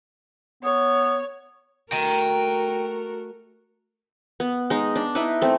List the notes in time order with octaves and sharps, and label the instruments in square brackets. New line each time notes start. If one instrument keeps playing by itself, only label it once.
[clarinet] B3 [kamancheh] C#5
[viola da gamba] A3 F#4 A#4 [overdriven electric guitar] G5 A#5
[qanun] B3
G#3 D#4
D4
D#4 E4 B4
A3 C4